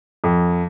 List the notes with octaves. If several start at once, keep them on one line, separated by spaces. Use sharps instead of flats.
F2